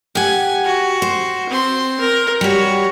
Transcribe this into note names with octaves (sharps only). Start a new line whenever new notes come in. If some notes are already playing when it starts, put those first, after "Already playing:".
G4 F#5 G#5
F#4
C5
C4 C6
A#4
G3 F#4 G4 C#5